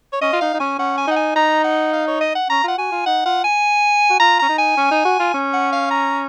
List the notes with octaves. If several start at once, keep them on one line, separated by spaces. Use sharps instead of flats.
C#5
C#4 D#5
F4
D#4 F5
D#4
C#4 G#5
C#4 F#5
G#5
D#4 F#5
G#5
D#4 A#5
F#5
F5
C#5
D#5
F#5
C#4 A#5
F4 F#5
F#4 G#5
F4
D#4 F#5
F4 F#5
G#5
F#4
F4 A#5
C#4 A#5
D#4
G#5
C#4
D#4
F#4
F4
C#4
F#5
F5
A#5